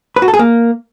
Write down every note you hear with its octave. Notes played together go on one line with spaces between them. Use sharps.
B4
F#4
A4
G#4
A#3